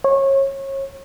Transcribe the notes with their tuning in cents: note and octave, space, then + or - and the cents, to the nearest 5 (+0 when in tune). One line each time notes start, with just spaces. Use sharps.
C#5 -25